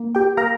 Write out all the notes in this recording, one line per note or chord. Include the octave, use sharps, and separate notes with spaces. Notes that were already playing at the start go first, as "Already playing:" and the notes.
Already playing: A#3
G4 G5
A#3 A#4 A#5